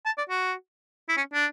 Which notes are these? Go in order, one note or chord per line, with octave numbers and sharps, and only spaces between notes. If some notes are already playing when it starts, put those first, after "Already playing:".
A5
D5
F#4
E4
C#4
D4